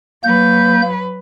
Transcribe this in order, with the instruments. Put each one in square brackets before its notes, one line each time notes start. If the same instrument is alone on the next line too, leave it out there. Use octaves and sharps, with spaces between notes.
[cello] F#3 B4 [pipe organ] A#3 G6